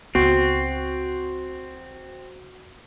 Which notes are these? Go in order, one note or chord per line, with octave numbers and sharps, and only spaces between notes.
C#2 B3 C4 F#4